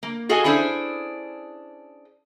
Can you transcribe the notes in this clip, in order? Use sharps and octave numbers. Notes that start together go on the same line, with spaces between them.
A#3
F#4 G#4 A4 D#5 F5 G#5
C#4 D4 E4 G#4 A4 C5